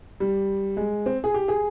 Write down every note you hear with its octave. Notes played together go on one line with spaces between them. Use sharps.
G3
G#3
C4
G#4
G4
G#4